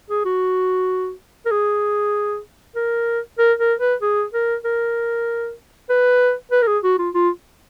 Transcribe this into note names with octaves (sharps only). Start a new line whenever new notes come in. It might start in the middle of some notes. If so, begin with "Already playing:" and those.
G#4
F#4
A#4
G#4
A#4
A#4
A#4
B4
G#4
A#4
A#4
B4
B4
A#4
G#4
F#4
F4
F4